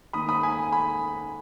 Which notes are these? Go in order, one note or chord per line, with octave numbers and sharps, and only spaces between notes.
D#3 A#3 B5 D#6
B5 D#6
G#5 B5
G#5 B5